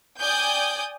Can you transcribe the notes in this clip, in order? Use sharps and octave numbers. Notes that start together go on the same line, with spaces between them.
D5 G5 G#5 D#6 G6